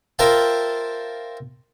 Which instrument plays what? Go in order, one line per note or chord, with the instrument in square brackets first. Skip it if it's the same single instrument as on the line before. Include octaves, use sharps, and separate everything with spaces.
[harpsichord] F4 A#4 C5 E5 G5 A5